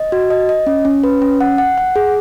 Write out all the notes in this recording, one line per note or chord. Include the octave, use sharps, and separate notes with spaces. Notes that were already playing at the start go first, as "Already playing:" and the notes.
Already playing: D#5
F#4
D#5
D#5
C#4
C#4
B4
C#4
F#5
F#5
F#5
G#4